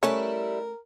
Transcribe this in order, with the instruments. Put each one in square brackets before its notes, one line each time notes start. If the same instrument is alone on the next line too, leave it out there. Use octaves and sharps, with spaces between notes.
[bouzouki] G3 E4 B4 [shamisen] A3 C#4 [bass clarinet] A#4